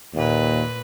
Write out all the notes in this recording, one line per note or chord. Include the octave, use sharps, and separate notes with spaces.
D#2 A#2 B4